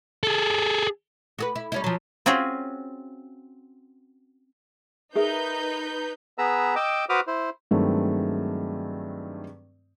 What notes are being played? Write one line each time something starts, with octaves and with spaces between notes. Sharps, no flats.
G#4 A4
F#4 G#4 B4
E4
G3 C#4 E4
F3 F#3
C4 C#4 F4 F#4 G#4
D#4 G#4 A#4 B4 E5 G6
B3 G#4 B4 A#5 E6
D#5 G5 D6 E6
F#4 B4 C5 D6 D#6 F6
E4 C5
G2 D#3 F#3 G#3 A3 C4